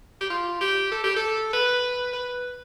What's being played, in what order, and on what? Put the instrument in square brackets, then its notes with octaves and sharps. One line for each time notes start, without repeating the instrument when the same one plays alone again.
[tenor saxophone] G4
F4
G4
A4
G4
A4
B4
B4